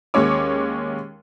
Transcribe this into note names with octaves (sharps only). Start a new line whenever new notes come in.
D#2 G#3 C#4 C#5 D6